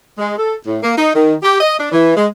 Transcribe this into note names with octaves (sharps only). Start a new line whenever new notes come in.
G#3
A4
A2
A#3
D#4
D#3
G4
D#5
D4
E3
G#3